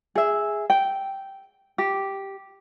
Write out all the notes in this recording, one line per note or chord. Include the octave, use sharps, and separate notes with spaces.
G#4 E5
G5
G4